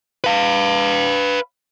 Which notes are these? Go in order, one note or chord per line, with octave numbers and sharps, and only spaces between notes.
B4 F5